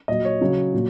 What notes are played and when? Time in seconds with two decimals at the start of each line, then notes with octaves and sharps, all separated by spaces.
0.08 A#2 F#3 D#5
0.25 C#5
0.41 C#3 F#3
0.74 A#2 F#3